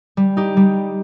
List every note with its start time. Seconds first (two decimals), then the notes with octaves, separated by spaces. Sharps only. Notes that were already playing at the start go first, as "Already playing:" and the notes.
0.17 G3
0.37 D#4 G4
0.57 G3